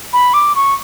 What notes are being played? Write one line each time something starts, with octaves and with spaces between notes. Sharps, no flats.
B5
D6
C#6